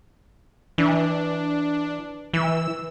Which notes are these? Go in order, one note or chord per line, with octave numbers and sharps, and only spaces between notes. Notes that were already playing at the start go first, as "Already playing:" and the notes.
E3 D4
E3 E6